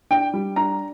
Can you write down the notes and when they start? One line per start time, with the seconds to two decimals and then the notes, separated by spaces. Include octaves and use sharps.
0.11 D4 G5
0.34 G3
0.56 D4 A#5